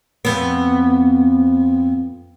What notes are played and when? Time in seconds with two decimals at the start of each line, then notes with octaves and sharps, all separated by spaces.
0.25 F2 B3